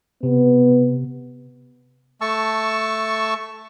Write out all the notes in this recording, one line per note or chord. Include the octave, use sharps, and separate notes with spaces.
C3 B3
A3 A5 C#6 E6